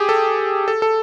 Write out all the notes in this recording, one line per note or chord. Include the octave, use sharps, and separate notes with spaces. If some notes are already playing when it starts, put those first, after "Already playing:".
Already playing: G4 G#4
A4
A4
A4